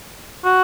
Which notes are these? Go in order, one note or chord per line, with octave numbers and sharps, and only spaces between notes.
F#4